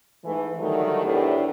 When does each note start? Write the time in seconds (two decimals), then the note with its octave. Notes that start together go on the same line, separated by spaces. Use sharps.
0.24 G#2 E3 A3
0.58 D3 D#3 F#3 G3 A3
1.02 E2 A2 B3 D4 G4 B4